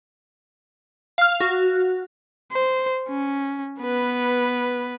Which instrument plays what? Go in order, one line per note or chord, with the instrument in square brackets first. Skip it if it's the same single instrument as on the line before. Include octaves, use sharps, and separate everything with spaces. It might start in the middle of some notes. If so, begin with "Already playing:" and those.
[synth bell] F5 F6
F#4
[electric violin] C5
C#4
B3 B4